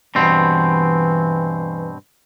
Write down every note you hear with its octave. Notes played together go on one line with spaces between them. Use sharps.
G2 B2 E3 C4